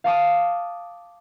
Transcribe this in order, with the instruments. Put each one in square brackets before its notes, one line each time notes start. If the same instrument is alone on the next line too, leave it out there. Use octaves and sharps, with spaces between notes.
[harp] F5 A5 D6 D#6